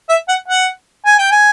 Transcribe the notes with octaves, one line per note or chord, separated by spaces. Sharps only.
E5
F#5
F#5
G#5
G5
G#5